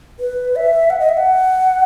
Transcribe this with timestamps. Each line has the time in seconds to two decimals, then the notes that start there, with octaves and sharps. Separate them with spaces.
0.20 B4
0.56 E5
0.90 F#5
1.00 D#5
1.09 E5
1.17 F#5